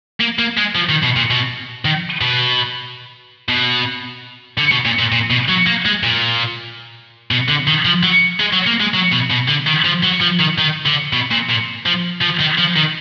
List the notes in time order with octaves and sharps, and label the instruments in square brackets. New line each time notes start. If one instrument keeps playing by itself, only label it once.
[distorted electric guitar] A#3
A#3
G#3
F3
D#3
B2
A#2
B2
D#3
B2
B2
D3
B2
A#2
A#2
A#2
B2
F#3
A#3
G#3
A#2
B2
D3
D#3
F3
F#3
G#3
F#3
A#3
G#3
F#3
B2
B2
D3
D#3
F3
F#3
F3
D#3
D#3
D3
B2
A#2
A#2
F3
F3
D#3
F3
D#3